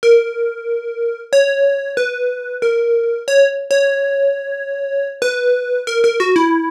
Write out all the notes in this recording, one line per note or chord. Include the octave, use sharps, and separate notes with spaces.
A#4
C#5
B4
A#4
C#5
C#5
B4
A#4
A#4
F#4
E4